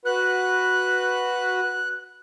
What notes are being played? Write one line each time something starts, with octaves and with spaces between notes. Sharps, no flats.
F#4 B4 F#6